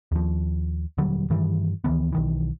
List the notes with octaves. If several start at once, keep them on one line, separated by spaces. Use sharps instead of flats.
D#2 F3
D#1 D3 F#3 G3
G2 D#3 E3 G3
D2 D#3 E3 B3
B1 D#3 E3